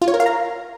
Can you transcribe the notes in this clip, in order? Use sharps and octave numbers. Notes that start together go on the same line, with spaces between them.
F4
C#5
A#4
F5
A#5